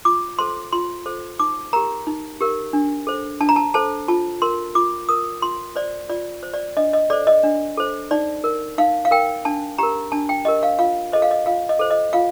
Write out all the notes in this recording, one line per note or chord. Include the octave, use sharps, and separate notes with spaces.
F4 D6
A4 C5 C6
F4 C6
A4 C5
D#4 D6
G4 A#4 A#5
D#4
G4 A#4
D4
A4 C5
D4 A5
A#5
A5
A4 C5 A5
F4 A5
A#4 C6
F4 D6
A#4 D#6
F4 C6
C5 D5
F4 D5
C5
D5
D4 D#5
D#5
A4 C5 D5
D#5
D4
A4 C5
D#4 D5
A#4
D#4 F5
F5
A#4 G5
D4 A5
G4 A#4 A#5
D4 A5
G5
G4 A#4 D#5
F5
F4 F5
A4 C5 D#5
F5
D#5
F4 F5
D#5
A4 C5
D#5
F4 F5